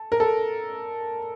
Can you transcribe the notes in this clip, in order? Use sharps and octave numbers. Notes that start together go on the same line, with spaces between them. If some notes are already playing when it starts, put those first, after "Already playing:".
Already playing: A4
A#4
A4